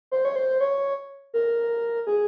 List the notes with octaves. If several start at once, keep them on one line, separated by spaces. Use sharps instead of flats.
C5
C#5
C5
C#5
A#4
G#4